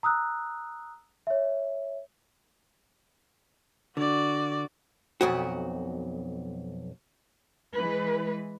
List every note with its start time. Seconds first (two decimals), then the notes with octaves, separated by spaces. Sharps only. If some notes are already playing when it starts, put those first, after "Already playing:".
0.03 A#5 D#6 E6 F#6
1.27 C#5 E5
3.97 D3 F#4 D5
5.21 B1 F2 F#4
7.75 E3 G#3 B4